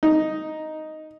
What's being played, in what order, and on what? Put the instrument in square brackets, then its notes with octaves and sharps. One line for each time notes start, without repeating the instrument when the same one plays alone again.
[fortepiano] D#4